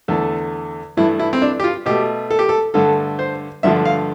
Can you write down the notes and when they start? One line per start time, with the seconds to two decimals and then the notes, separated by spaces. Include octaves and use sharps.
0.08 E2 D3 A3 A4
0.97 G2 E3 A3 E4
1.19 E4
1.33 C4
1.42 D4
1.60 G4
1.64 F4
1.86 B2 A3 G4
2.31 A4
2.39 G4
2.49 A4
2.74 G2 D3 A3 A4
3.19 C5
3.63 G2 D3 F3 A3 E5
3.85 F5